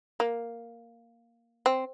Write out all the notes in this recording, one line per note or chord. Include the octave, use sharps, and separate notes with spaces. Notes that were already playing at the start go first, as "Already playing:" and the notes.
A#3
C4